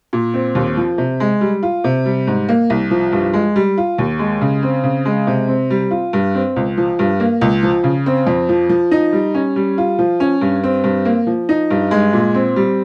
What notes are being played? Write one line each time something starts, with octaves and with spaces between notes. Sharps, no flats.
A#2
C4
D#2
F3
C3
G#3
G3
F4
C3
G3
G#2
A#3
C2
F3
G2
G#3
G3
F4
D#2
G#3
C#3
C4
C#3
G#3
C3
C4
G3
F4
G2
C4
C#2
F3
G2
A#3
C#2
F3
C#3
C4
F2
F3
F3
D#4
G3
C#4
G3
F4
F3
C#4
G2
C4
G2
A#3
F3
D#4
G2
G#3
A#2
C4
G3